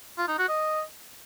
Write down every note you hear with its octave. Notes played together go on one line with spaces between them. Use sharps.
F4
D#4
F#4
D#5